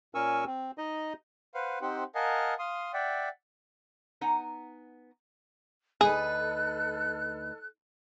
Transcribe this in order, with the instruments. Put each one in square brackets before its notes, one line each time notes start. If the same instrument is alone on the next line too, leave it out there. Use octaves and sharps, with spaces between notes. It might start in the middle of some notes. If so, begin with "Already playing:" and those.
[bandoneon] A#2 C#4 A#4 G#5 C#6 E6
C4
D#4 D#5
[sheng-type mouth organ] B4 C5 F5 F#5
C4 D#4 G4 C5 F#5
A#4 D#5 F5 F#5 G#5 A5
F5 C6 D#6
D5 E5 F#5 G5
[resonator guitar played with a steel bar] B3 D#4 F#5 G#5 A#5
[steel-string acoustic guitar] D2 D#4 B4 [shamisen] G#4 [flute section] A4 F#6